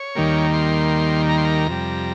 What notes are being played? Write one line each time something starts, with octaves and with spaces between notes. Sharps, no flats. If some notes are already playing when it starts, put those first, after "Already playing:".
Already playing: C#5
D#2 D#3 G3 A#3
C6
A#5
C6
A#5
F2 C3 G3